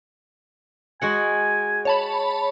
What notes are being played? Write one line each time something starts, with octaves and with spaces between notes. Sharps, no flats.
G#3 F#4 F#5 G#5
C#5 A5 B5